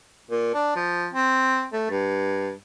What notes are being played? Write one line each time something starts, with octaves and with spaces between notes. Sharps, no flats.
A#2
D4
F3
C4
A3
G2